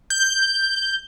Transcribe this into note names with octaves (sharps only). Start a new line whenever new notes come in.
G6